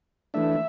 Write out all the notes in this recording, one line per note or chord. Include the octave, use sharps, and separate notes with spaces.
E3 A3 D4 E5